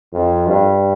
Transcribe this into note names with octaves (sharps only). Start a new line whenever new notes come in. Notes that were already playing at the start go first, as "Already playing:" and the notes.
F2
G2